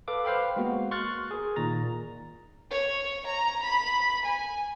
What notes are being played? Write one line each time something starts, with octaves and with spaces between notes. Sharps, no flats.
A4 B4 F5 D6
B4 C5 F5 G5 B5
G#3 A#3 B3 F#4
C6 C#6 F6 F#6 A6
G#4 A#4
A#2 D#3 A#5 A6
C#5
A#5
B5
G#5